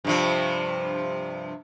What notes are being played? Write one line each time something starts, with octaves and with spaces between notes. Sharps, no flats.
G2 C3 F3